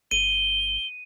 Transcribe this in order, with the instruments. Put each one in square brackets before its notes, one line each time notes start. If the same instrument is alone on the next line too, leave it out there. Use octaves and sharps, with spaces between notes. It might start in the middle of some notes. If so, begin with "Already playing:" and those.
[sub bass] G1 [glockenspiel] D#7 [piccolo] G7